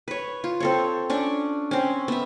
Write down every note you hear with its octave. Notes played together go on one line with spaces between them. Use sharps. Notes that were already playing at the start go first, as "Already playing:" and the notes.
B4 C#5
F4
C4 A4 C#5
C#4 D4 C#6
C4 C#4
B3 E5